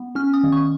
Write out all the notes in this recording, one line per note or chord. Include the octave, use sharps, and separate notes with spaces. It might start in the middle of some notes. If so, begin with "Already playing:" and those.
Already playing: B3
C#4 F6
D#6
D#3
C#6